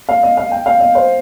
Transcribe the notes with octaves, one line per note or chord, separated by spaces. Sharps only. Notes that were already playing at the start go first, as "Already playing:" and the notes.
F5
D#5
F5
G5
F5
D#5
C5